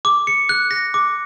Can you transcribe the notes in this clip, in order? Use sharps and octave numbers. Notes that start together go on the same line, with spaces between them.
D6
C#7
F#6
A#6
D6